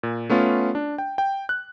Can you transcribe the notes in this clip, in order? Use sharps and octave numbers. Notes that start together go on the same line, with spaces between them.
A#2
A3 B3 C#4 F4
D4
G5
G5
F#6